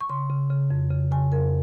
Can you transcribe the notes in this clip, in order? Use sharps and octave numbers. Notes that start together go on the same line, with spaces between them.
C#6
C#3 C6
C#3
C#3
F2
C#3
C#3 G#5
F2 A#4